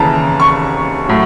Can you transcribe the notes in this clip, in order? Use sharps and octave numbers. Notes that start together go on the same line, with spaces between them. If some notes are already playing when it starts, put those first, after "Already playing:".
Already playing: D#2 C#3 E3 A5 A#5
C#6
A2 F#3